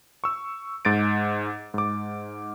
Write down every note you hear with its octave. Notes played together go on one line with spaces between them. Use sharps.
C#6 E6
G#2 A6 D7
G#2 D6